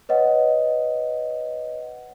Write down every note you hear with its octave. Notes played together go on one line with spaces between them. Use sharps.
B4 C#5 D#5 F#5